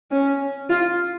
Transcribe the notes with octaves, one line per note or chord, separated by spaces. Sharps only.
C#4
F4